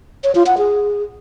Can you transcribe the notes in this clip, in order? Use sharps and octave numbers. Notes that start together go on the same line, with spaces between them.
C#5
F4
F#5
G#4